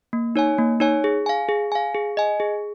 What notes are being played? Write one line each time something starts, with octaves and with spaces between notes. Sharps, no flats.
A#3
D#4 C#5 G#5
A#3
D#4 C#5 G#5
G#4
F5 G#5
G#4
F5 G#5
G#4
D#5 G#5
G#4